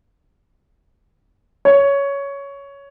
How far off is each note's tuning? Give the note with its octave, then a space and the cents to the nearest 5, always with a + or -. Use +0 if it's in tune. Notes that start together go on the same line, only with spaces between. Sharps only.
C#5 +10